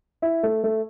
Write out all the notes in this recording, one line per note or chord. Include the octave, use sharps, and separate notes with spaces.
E4
A3
A3